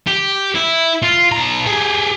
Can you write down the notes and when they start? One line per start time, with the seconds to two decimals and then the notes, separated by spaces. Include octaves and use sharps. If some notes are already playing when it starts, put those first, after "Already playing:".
0.07 G4
0.55 E4
1.03 F4
1.32 B1 A#5
1.67 G4 G#4